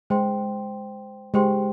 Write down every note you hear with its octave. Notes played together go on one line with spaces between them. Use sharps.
G#3 C5 G5 C6
G#3 G4 C5 G5 C6